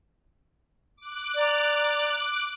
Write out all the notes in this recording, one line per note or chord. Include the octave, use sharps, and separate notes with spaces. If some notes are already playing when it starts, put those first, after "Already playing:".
D6 F#6
D5 A#5